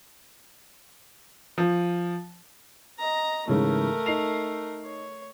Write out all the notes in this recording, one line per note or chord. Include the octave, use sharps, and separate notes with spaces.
F3
D#5 A#5
G#2 C#3 E3 A3 A#4
D#4 C7 F7
C#5